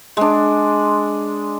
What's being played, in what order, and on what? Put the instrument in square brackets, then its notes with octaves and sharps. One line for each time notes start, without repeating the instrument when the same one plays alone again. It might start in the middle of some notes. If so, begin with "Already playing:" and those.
[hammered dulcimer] G#3 D4